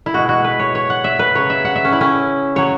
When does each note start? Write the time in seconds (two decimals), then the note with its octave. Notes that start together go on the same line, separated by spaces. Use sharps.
0.06 E4
0.14 B2 G#3 F#4
0.29 F#4
0.44 B4
0.59 C#5
0.75 C#5
0.90 F#5
1.04 E5
1.19 B4
1.35 C#3 F#3 C#5
1.50 E5
1.65 F#5
1.76 E5
1.85 C#4
1.92 E4
2.01 C#4
2.56 C#3 F#3 C#5